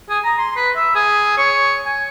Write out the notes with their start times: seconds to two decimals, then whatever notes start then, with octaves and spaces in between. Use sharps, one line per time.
0.10 G#4
0.24 A#5
0.39 C6
0.56 B4
0.76 E5
0.95 G#4
1.38 C#5
1.86 G#5